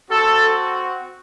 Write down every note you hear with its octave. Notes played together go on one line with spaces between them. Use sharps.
C4 F#4 A4